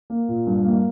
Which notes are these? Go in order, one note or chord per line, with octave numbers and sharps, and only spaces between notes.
A#3
A#2
G2
A#3